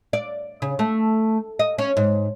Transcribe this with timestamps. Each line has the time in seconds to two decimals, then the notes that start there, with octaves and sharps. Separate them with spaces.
0.13 D5
0.62 C#3
0.79 A3
1.59 D#5
1.78 C#4
1.97 G#2